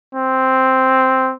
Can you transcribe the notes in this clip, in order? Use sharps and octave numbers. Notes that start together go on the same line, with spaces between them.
C4